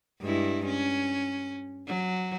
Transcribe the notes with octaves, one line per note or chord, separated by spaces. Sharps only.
G2 G#3 E4
C#4
F#3